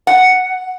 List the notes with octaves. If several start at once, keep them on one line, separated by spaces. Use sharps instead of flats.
F#5